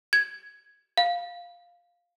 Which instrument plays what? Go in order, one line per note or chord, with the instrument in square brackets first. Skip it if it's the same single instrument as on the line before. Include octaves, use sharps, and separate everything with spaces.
[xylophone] G#6
F5